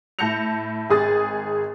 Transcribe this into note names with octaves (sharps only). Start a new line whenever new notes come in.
A2 A5 G6 A#6 C#7 F7
G#1 G#4 D#6 A6